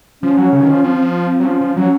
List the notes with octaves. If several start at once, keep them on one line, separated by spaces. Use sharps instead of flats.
F3 C#4
F#3
C#3
D#3
F3
F3 C4
C4
F#3
F3 C#4
F3
F#3 C#4